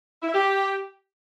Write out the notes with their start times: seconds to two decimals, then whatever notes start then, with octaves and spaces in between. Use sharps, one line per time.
0.22 E4
0.28 E5
0.34 G4